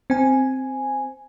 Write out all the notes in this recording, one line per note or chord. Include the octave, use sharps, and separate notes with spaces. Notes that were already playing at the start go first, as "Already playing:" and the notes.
C4 G#5